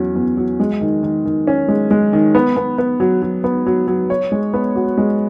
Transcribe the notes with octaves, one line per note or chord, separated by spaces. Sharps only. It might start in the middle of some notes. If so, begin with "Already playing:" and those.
Already playing: E2 F#3 C#4
E2
F#3
G#3
D#3
D#3
D#3
C#4
G#3
G#3
D#3
B3
B3
B3
F#3
F#3
B3
F#3
F#3
C#5
G#3
B3
F#4
G#3